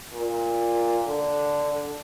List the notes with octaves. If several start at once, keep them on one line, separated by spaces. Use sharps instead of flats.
A#2
D3